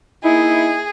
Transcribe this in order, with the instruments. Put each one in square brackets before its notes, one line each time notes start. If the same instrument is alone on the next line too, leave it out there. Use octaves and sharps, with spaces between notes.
[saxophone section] A#3 D#4 E4 [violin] G#4